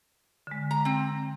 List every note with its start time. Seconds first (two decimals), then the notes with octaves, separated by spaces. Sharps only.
0.47 D3 G#3
0.71 A#5
0.85 C4